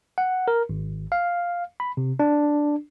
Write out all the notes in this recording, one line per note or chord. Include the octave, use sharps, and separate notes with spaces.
F#5
A#4
G#1
F5
B5
C3
D4